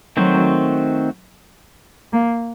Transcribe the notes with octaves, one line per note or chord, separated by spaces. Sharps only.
D#3 F#3 A3 C4 F#4 C5
A#3